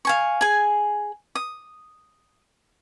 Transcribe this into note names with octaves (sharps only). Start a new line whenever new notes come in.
F5 G#5 C#6
G#4 G#5
D#6